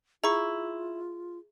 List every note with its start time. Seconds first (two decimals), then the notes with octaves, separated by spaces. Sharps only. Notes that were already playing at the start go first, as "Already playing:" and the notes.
0.24 E4 F4 G#4 A#5 C#6